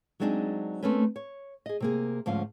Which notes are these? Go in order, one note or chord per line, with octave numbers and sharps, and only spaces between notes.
F#3 G#3 C4 D4 D#4 G#4
A3 A#3 C4 C#4 B4
C#5
G#4 D#5
C3 A#3 G#4
D2 G#2 F3 C#4 F5